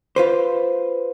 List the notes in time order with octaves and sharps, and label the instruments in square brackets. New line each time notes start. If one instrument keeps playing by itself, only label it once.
[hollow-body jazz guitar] F4 B4 C5